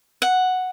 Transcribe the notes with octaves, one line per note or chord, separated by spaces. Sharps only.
F#5